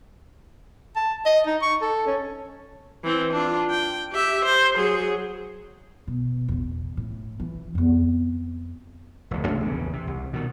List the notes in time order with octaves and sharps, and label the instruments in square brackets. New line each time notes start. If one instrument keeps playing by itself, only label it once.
[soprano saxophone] A5
D#5
D#4
C#6
A4
C#4
[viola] E3 C4
D4 F4
G5
G4 E5
C5
F#3 G#4
[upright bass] B2
A1 E2
A2
E3
F2 B3
[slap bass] F1 D2
C#2 C#3 A3 D4
A#1 E2 C#3
C3
C2
B2 D#3